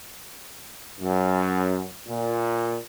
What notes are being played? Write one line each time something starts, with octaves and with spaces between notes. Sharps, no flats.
F#2
A#2